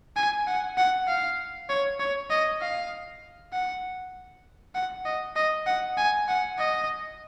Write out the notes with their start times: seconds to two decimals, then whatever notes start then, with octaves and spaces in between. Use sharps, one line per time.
0.16 G#5
0.47 F#5
0.77 F#5
1.08 F5
1.69 C#5
2.00 C#5
2.30 D#5
2.61 F5
3.53 F#5
4.75 F#5
5.05 D#5
5.36 D#5
5.66 F#5
5.97 G#5
6.28 F#5
6.58 D#5